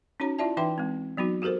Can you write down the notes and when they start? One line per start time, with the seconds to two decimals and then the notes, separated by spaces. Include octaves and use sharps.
0.20 C#4 D#4 F#4 C#5 A#5
0.39 E4 F4 D5 E5 A5
0.57 E3 D#4 B4 E5 G5 C6
0.78 G#3 C4
1.17 F#3 B3 D#4 F#4
1.42 F#4 G4 A4 A#4 C5